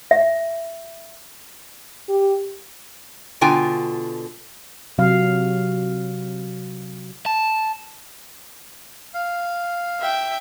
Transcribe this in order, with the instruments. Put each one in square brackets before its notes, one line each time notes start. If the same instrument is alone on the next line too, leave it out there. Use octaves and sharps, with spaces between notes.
[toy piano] E5
[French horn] G4
[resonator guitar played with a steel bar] B2 D3 F4 G5 G#5 A#5
[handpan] C3 F#3 F5
[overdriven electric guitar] A5
[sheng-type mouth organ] F5
[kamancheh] E5 G5